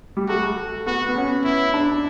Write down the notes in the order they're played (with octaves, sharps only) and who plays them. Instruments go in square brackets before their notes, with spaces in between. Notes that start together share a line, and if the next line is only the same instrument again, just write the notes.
[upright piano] G3
[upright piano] A3 [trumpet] F#4
[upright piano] A3
[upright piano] B3 [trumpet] F#4
[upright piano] B3
C#4
[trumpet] E4
[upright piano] D4